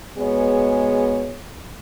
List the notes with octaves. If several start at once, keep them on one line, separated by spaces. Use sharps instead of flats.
B2 G#3 B3 G#4 C#5